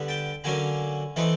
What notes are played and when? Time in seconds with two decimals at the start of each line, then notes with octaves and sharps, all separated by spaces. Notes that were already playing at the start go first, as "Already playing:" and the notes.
Already playing: D3 G3 B3
0.08 G5 A5
0.44 D3 F#3 A#3 C#4 G#5 A#5
1.16 E3 A3 C4 D#4